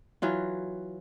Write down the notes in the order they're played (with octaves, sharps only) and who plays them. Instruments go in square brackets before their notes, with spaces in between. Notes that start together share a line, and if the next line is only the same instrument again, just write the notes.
[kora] E3 F#3 F4